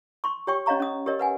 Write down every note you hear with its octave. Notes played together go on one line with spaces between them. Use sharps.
C6 C#6
G4 C#5 G5 C#6
C#4 C#5 D#5 F5 A#5 C#6
C#4 D#6
G4 A#4 C#5 D#5
B4 F#5 G#5